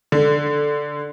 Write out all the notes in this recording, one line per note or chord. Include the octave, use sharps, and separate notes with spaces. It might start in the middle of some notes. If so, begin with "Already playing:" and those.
D3